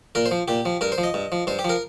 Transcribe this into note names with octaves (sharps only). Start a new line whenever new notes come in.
A#2 A#4
C5
F3
A#2 G4
F3
G2 A#4
C5
F3
D#5
G2
F3
G2 C5
G4
F3 A#4